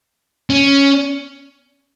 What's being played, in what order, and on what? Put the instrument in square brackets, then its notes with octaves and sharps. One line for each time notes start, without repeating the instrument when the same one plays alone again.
[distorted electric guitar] C#4